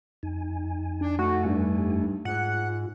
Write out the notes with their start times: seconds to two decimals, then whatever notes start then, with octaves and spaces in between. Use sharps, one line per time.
0.23 F2 D#4 G#5
1.01 D4
1.19 A3 F#4
1.45 G2
2.25 G#2 F4 F#5